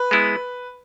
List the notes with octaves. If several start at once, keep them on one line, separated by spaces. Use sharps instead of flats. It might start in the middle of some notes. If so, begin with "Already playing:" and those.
Already playing: B4
G#3 B3 E4